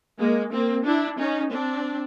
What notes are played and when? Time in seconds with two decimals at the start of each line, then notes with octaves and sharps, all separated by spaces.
0.19 G#3 A#3
0.52 A#3 C4
0.84 D4 E4
1.18 C#4 D#4
1.50 C4 D4